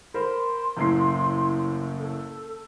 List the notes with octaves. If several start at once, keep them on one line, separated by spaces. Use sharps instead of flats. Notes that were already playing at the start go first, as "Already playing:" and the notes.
A#4 C5 B5 C6
F#1 A2 C7
A4